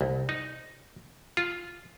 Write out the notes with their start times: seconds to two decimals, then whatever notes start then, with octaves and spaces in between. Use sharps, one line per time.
0.01 C2
0.29 D#4
1.37 F4